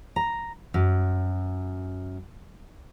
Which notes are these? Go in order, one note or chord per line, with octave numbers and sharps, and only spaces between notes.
A#5
F#2